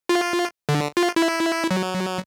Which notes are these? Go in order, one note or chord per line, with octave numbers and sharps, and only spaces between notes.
F4
D3
F4
E4
F#3